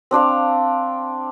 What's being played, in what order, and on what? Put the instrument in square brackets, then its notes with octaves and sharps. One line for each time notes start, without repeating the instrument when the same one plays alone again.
[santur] C4 D4 D5 F5